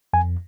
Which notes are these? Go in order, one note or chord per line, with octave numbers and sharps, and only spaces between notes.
F2 G#5